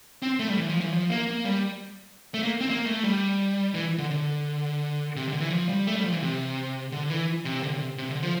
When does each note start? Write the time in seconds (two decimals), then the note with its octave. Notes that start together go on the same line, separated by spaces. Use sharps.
0.22 C4
0.39 A3
0.48 G3
0.57 E3
0.69 F3
0.81 E3
0.93 F3
1.10 A#3
1.27 A#3
1.45 G3
2.34 A3
2.43 A#3
2.61 C4
2.69 A#3
2.86 A3
3.04 G3
3.74 E3
3.98 D3
4.10 D3
5.16 C3
5.28 D3
5.40 E3
5.50 F3
5.69 G3
5.87 A3
5.96 G3
6.05 F3
6.13 E3
6.22 C3
6.92 D3
7.09 E3
7.45 C3
7.63 D3
7.75 C3
7.98 C3
8.10 D3
8.22 F3